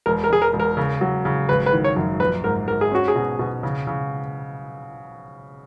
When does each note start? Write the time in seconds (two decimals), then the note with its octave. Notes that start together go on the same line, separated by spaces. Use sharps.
0.06 E1 A#4
0.24 A#4
0.29 E1 G#4
0.42 A#4
0.53 E1
0.60 A#4
0.77 C#3
1.01 F#3
1.25 C#3
1.49 G#1 B4
1.66 B4
1.73 D#3
1.84 C#5
1.97 F#2
2.20 A#1 B4
2.44 G#2 A#4
2.68 G#2 A#4
2.81 G#4
2.92 C#4 F#4
3.08 G#4
3.16 B2
3.39 B2
3.63 C#3
3.87 C#3